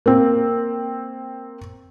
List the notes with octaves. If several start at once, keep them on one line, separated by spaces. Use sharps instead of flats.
A#3 C4